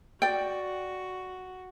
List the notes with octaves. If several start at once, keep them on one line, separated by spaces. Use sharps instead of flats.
F#4 D5 G5